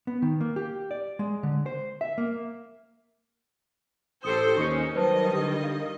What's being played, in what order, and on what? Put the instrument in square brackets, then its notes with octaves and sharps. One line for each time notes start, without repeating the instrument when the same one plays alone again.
[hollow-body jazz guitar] B3
D#3
A#3
G4
D5
G#3
D3
C5
E5
A#3
[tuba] A1 [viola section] G4 A4 C5 [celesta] D#6 C#7
[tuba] D#2 [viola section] C#4 D#4 [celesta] C#6 C#7
[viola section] D#3 G3 D#5 [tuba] F#3 [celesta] B4 C5 A5
[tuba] D3 [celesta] G4
[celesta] F5